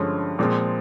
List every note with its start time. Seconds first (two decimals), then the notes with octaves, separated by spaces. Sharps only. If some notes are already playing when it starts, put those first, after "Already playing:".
Already playing: G2 D3 F3 G#3 C#4
0.39 A#2 F3 G#3 C4